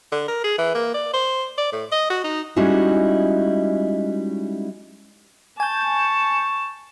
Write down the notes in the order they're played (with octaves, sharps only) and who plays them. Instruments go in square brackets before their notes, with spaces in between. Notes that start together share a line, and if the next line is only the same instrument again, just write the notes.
[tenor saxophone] D3
A#4
G#4
E3
A#3
D5
C5
D5
A2
D#5
F#4
D#4
[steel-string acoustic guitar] G3 G#3 C#4 D#4 E4 F#4
[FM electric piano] G#5 G6 [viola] A5 [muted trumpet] C#6